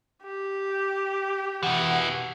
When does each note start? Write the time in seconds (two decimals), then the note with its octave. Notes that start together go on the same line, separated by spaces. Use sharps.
0.23 G4
1.63 B2 E3 F#5